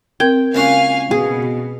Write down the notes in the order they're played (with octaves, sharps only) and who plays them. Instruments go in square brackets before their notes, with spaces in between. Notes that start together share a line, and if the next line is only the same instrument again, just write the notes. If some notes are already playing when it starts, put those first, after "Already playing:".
[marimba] C4 A#4 G#6 [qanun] G5
[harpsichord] C#2 A#3 F#4 [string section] F5 G#5
[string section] B2 [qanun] G#4